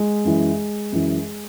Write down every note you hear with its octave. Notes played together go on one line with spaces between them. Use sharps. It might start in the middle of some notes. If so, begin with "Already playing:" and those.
Already playing: G#3
F#2 E3
F#2 E3